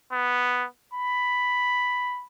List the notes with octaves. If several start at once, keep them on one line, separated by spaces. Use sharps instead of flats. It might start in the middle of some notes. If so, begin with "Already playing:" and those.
B3
B5